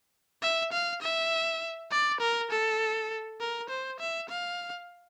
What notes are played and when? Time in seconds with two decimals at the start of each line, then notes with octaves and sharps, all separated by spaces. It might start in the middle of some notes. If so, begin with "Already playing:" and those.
0.42 E5
0.73 F5
1.02 E5
1.91 D5
2.20 A#4
2.51 A4
3.40 A#4
3.70 C5
4.00 E5
4.30 F5